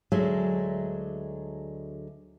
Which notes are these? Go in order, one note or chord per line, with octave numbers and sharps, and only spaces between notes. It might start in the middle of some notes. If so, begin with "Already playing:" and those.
D2 F#3 G#3 A3 D4